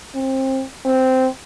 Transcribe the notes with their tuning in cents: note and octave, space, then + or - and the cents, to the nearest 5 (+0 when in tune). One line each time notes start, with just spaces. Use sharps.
C4 +25
C4 -10